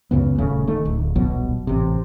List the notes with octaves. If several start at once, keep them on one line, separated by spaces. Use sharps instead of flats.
C#2 F#2 C#3 B3
D#1 C#3 A3
D#3 A3
D1
D#1 B1 B2 F#3
A1 C3